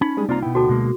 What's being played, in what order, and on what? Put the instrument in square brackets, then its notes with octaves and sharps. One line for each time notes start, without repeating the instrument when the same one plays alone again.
[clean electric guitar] C#4 B5 [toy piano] D#4
[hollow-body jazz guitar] G3 G#3 G#4
[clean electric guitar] C2 F4 A#5 [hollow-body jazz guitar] A#3 C4 D5
[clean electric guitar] B2 B3 G5 [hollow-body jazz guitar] E4
[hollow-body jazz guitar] D2 A5 [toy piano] F#4 A4 D6
[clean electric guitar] B2 G#3 A#3